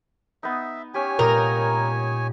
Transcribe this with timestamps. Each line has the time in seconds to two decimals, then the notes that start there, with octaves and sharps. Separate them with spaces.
0.43 B3 D#4 E5
0.94 C#4 G4 C#5 G#5
1.19 A#2 G#3 D#4 A#4 D#6